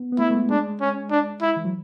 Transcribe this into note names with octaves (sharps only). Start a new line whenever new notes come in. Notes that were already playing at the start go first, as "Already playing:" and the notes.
Already playing: B3
B3
A3 E4
A3
G#3
G#3 D4
C#4
D4
E4
E3
F#3